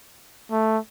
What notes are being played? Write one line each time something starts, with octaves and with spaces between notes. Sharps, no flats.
A3